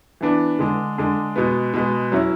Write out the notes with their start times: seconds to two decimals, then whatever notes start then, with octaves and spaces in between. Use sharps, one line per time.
0.21 E3 B3 D4
0.59 D3 G#3 D4
0.98 D3 G#3 D4
1.36 B2 G#3 B3
1.74 B2 G#3 B3
2.12 F#3 C#4 E4